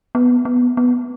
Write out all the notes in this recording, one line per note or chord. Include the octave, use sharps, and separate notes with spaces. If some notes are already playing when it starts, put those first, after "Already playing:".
B3
B3
B3